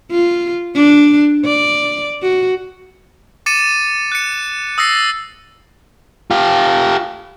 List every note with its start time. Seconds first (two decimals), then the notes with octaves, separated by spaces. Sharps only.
0.11 F4
0.75 D4
1.45 D5
2.23 F#4
3.46 D6 A6 C#7 D#7 E7
4.12 F#6 C#7
4.78 D#6 E6 A6 A#6 C7
6.31 F4 G4